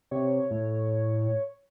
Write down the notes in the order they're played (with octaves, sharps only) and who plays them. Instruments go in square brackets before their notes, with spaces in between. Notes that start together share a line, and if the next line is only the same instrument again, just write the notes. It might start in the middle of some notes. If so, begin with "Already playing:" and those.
[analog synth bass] C3 [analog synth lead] C#5
[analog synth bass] A2